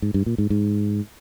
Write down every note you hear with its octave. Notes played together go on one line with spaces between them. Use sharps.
G#2
G2
A#2
G#2
G#2